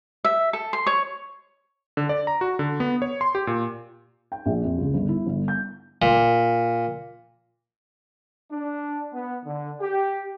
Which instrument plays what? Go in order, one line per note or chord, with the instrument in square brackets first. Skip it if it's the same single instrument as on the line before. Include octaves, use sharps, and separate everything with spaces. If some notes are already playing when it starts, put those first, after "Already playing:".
[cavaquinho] E5
A4
C6
C#5
[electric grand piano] D3
D5
A#5
F#4
D3
B3
C#5
C6
G4
A#2
[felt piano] G5
A#1
F2
C#2
G1
E4
G1
G6
[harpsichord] A#2
[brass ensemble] D4
B3
D3
G4